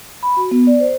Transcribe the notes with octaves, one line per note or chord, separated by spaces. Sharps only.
B5
F#4
B3
D5
C5